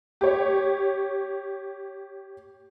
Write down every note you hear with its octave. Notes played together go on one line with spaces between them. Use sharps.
G4 C#5